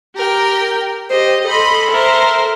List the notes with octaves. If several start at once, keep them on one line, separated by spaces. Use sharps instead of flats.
G4 A#4 G5
G4 C5 D#5
A4 D#5 B5 C6
A#4 C5 E5